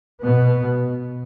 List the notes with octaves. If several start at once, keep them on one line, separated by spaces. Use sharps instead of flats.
B2 B3